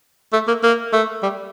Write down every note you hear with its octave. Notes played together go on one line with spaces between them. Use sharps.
A3
A#3
A#3
A3
G3